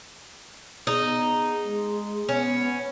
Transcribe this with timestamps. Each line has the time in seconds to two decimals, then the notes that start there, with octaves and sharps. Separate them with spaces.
0.87 B3 D#4 G#4
1.63 G#3
2.29 B3 C#4